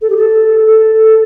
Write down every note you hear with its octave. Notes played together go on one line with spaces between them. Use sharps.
A4
G4
A4
A4